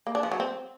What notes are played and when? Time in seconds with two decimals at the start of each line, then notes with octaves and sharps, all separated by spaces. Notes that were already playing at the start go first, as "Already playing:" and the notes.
0.07 A#3
0.15 D4
0.23 F3
0.31 F#3
0.40 C4